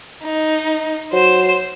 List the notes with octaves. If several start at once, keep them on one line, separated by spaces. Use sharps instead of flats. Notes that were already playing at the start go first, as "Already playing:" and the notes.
D#4
F#3 C5 E7